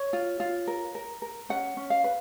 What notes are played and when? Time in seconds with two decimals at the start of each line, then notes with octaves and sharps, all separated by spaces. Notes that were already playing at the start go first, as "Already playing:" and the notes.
Already playing: C#5
0.13 F4
0.40 F4
0.68 A#4
0.95 A#4
1.22 A#4
1.49 C#4 F#5
1.77 C#4
1.90 F5
2.04 B4